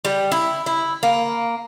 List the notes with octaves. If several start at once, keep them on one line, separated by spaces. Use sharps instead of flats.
G3
E4
E4
A#3